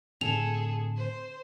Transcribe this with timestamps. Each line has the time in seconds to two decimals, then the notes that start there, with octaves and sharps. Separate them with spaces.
0.21 A2 D3 C4 G#4 A4 F7
0.97 C5